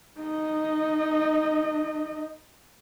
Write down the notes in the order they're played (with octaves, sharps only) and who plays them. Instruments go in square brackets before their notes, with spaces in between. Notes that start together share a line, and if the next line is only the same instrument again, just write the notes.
[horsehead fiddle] D#4 D#5